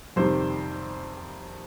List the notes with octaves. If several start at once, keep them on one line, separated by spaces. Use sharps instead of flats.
F2 C3 D#3 G3 C5